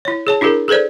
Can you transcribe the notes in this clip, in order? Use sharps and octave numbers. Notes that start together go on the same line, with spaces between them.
E4 C#5
G#4 C#5 A5
D4 E4 G4 G#4 A#4
G#4 A4 B4 C5 D5